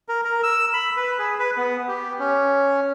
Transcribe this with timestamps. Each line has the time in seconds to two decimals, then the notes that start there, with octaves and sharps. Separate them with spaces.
0.08 A#4
0.25 A#4
0.43 E6
0.74 B5
0.97 B4
1.19 G#4
1.39 B4
1.57 B3
1.88 G4
2.19 C#4